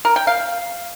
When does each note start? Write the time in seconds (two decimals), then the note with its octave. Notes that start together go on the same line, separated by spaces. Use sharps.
0.05 A#4
0.16 G5
0.27 F5